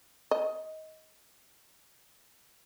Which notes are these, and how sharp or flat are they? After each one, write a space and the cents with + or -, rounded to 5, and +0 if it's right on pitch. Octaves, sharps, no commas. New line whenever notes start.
D#5 +20